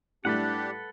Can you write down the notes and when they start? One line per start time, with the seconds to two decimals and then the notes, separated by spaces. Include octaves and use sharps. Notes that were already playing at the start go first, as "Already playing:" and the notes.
0.25 A2 G3 A3 D4 G4 A4 B4 F#5